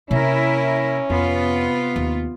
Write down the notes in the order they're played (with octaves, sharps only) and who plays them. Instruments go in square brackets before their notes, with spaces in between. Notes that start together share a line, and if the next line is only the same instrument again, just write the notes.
[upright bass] C3 A#3 [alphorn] C#4 [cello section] E4 A#4 E5
[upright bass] F2 [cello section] C3 B3 F4
[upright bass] D#2